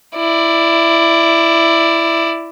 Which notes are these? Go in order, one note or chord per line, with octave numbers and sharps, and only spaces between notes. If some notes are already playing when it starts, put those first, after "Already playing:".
E4 D5